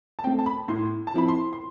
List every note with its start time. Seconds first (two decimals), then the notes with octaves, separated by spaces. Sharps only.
0.19 A5
0.24 C4 G5
0.27 A3
0.39 A5
0.46 B5
0.68 A2 C6
1.07 A5
1.14 F3 C4 E4 B5
1.28 C6
1.53 C6